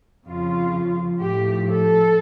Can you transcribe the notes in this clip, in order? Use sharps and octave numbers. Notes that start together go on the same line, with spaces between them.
F2 C#3 F3 F4
A2 F3 A3 G4
A4